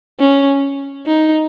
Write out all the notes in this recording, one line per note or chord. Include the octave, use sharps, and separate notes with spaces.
C#4
D#4